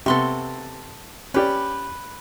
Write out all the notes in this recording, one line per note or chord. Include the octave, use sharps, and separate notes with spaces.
C3 B3 A4 C6 C#6
C#4 G4 B4 D5